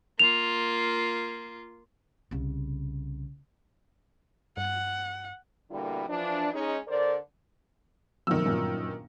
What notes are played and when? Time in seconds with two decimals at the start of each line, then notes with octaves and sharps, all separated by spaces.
0.19 A#3 F4 F7
2.31 C2 C#3
4.57 G2 F#5
5.71 B2 D3 G3 A#3 E4
6.08 E3 F3 D4
6.53 G#3 C#4 D#4
6.88 D3 A#4 C5 D5
8.27 F#1 B1 F2 D#3 E6
8.45 G1 F#2 A#2